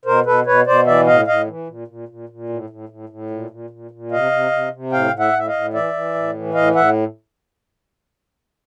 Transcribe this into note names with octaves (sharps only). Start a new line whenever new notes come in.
B2 A#4 C5
B2 A4 B4
B2 B4 C#5
B2 C5 D5
E3 D5 E5
A2 D#5 F5
A2 D#5 F5
E3
A#2
A#2
A#2
A#2
A2
A2
A2
A2
A#2
A#2
A#2
A#2
C3 D#5 F5
C3
C3
C3
A2 F5 G5
A2
E5 F#5
A2 E5
D#5 F5
A2
E3 D5 E5
E3
A2
E3
A2 D#5 F5
A2 E5 F#5